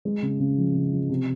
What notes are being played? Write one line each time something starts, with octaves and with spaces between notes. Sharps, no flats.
G#3
C#3
C#3
F3
C#3
F3
C3